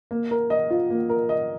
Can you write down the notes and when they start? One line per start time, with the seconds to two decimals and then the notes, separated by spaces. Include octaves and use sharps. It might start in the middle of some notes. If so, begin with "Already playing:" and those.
0.11 A#3
0.31 A#4
0.50 D#5
0.70 F4
0.90 A#3
1.09 A#4
1.29 D#5